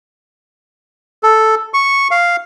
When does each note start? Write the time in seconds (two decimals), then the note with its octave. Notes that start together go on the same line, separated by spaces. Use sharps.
1.23 A4
1.74 C#6
2.11 F5